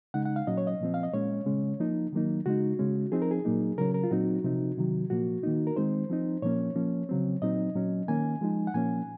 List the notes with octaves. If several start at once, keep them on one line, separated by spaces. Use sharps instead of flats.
C#3 G#3 D#4 F#5
F#5
F5
A#2 F#3 C#4 D#5
C#5
D#5
A#2 F3 C4
F5
D#5
A#2 G#3 C#4 C#5
C#3 G#3 C#4
F3 A#3 D#4
D#3 F#3 A#3 D#4
C#3 G#3 D#4 F#4
C#3 G#3 C#4
F3 C4 D#4 G#4
A#4
G#4
A#2 F#3 A#3 D#4
C#3 F#3 C#4 A#4
A#4
F4
A#2 F#3 C4 D#4 F#4
C3 F3 C4 D#4
C3 D#3 F#3
A#2 F3 A#3 F#4
D#3 A#3 D#4
A#4
D#3 G#3 C4 D#4 C5
F3 C4 D#4
A#2 F3 A#3 C#4 C#5
F3 A#3 C#4
C#3 F#3 C4
A#2 F#3 C4 D#4 D#5
A#2 F#3 C#4
D#3 A#3 C#4 G#5
F3 G#3 D#4
F#5
A#2 F3 A#3 C#4 G#5